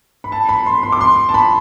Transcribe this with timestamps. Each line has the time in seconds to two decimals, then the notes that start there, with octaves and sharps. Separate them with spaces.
0.24 B5
0.32 A5
0.49 B5
0.66 C6
0.83 C6
0.92 D6
1.01 C6
1.29 A5
1.34 B5